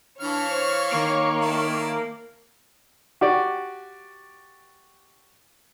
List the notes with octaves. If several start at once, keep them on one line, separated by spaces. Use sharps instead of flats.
E3 D4 C#5 F5 C#6 F6
C5
D#3 A#3
E4 A4 D5
F#4 G4 D5